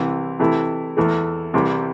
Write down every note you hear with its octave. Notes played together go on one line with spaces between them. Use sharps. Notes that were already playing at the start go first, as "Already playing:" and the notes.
Already playing: C2 C3 E3
C3 E3 A3 E4
E2 E3 A3
C2 C3 E3 G3